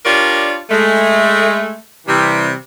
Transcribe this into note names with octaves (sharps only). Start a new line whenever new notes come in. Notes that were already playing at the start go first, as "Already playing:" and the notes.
D4 F4 G4 A#4 C#5 D5
G#3 A3
C3 E3 G3